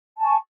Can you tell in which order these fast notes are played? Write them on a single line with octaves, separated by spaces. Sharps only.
A5 G#5 C#6